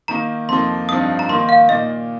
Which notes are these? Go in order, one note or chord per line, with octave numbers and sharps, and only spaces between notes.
D#3 A#3 D#4 A#5
F2 F3 A#3 D#4 C6
G2 F3 C4 D#4 D#6
A#5
D#3 A#3 D#4 C6
F5
A#2 A#3 D#4 D#5